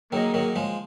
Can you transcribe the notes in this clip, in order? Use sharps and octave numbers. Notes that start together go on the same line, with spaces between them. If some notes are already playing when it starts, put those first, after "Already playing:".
D#3 F#3 A#3 D#4 G#4 D#5
D#3 F#3
F3 G#3